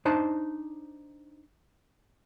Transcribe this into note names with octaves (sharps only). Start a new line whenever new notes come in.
D4 D#4 C5 A5